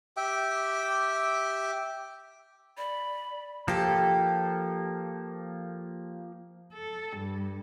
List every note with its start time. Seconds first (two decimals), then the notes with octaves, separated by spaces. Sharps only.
0.17 G4 E5 G5 D6
2.78 D5 B5
3.68 F3 A#3 G4 A4
6.73 A4
7.16 G2